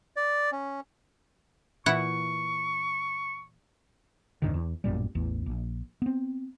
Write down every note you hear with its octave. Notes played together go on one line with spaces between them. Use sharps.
D5
C#4
A#2 E3 E4 F#5 C#6
D2 G2 C3 D#3
E2
A1 F#2 A#2 G3
A1 E2
A#1
B3 C4